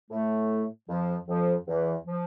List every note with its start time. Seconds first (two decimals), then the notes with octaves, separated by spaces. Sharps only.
0.11 A2 A3
0.89 F2 F3
1.28 F2 F3
1.67 E2 E3
2.07 F3